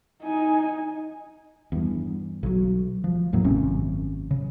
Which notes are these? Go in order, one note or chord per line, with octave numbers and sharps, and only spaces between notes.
D#4 G#5
E2 G2
B1 F#3
F3
E2 A2 F#3 A#3
G#1 F#2 C3 C#4
C#3